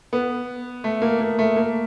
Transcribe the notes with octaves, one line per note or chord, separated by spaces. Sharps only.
B3
A3
A#3
A#3
A3
A#3